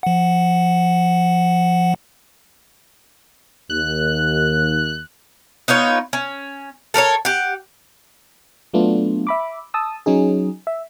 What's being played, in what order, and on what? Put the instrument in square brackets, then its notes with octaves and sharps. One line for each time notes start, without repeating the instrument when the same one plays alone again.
[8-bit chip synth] F3 F#5
[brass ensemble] D#2 [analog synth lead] F#6
[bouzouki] B3 D#4 F4 C#5
C#4
A4 A#4 C5 C#5
G4 F#5
[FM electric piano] F#3 A3 B3 D4 F4
E5 B5 D6
A5 D#6 E6
F#3 C#4 D#4 G#4
E5